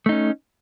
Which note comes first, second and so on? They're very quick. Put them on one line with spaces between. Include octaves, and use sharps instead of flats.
A3 D#4 C#4